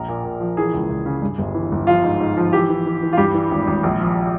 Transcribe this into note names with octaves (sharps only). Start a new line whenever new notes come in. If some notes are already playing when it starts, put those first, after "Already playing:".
Already playing: A#1 A#4
A#2
A#2
F3
E3 G#4
C#2
C#2
C#3
G2
G1
E3
G1
F3 F4
G#2
G#2
F3
E3 G4
E3
E3
E3
F4
G2 G4
E3
G#1
G#1
A#1
F3